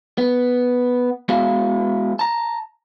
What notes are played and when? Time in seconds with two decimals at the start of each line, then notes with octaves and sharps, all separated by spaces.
0.18 B3
1.29 G#3 B3 E4 F#4 G#4 F5
2.19 A5 A#5